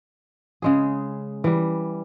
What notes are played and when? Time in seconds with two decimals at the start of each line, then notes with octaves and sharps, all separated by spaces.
0.62 C#3 G#3 G#4
1.44 E3 G3